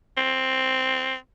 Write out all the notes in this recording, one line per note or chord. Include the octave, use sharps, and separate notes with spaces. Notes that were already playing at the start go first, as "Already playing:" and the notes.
C4